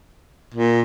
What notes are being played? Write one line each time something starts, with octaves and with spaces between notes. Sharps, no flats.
A#2